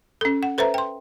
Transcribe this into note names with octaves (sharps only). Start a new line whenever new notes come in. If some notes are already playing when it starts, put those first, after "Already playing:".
C#4 A4
F#5
A4 B4 C5 E5 A#5
G5 C6